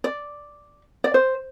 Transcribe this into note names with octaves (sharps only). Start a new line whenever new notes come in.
D5
D5
C5